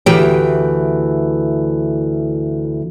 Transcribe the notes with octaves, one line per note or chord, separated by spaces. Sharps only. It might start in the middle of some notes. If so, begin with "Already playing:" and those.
D2 E3 G4 G5